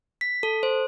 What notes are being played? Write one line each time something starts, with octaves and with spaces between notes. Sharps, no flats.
B6
A4
C5